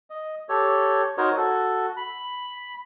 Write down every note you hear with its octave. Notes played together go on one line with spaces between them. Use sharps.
D#5
G4 A4 C#5
D#4 F#4 A#4 C5 C#5 D#5
F#4 A4
B5